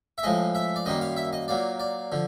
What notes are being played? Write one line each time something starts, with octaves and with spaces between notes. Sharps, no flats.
E5
A2 F3 G#3 D#5
E5
D5
F#2 D#3 G3 A#3 D#5
F5
E5
D#5
A#2 F#3 A#3 D5
D5
D3 F3